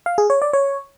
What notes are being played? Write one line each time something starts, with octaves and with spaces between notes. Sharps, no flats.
F5
G#4
C#5
D5
C#5